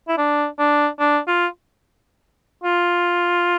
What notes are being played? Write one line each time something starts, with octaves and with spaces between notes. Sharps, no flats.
E4
D4
D4
D4
F4
F4